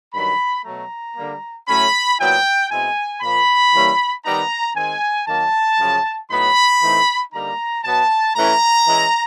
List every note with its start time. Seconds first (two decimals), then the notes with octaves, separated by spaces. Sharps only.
0.14 G2 D#3 F#3 B5
0.65 B2 F#3 A3 A#5
1.17 D3 G3 A#3
1.68 A2 F#3 A3 C#4 B5
2.19 A#2 F#3 B3 E4 G5
2.71 B2 G#3 C4 E4 G#5
3.22 A#2 F3 A#3 B5
3.74 E3 G3 A#3 C#4 E4
4.25 D#3 G3 B3 D#4 A#5
4.76 D#3 G#3 C4 G#5
5.28 D#3 F#3 A#3 A5
5.79 F#2 C#3 F3
6.30 A2 F#3 B3 D#4 B5
6.82 A2 E3 A3 C4 D#4
7.33 D3 G3 A#3 D#4 A#5
7.84 B2 F#3 B3 A5
8.36 A2 E3 A3 C#4 E4 A#5
8.87 E3 G#3 C#4 E4